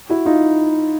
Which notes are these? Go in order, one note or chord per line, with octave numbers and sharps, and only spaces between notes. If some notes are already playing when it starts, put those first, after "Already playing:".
E4 F#4
D#4 F4